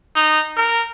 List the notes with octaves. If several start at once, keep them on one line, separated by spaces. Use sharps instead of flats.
D#4
A#4